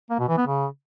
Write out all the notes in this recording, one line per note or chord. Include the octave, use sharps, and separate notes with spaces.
A#3
B2
E3
B3
C#3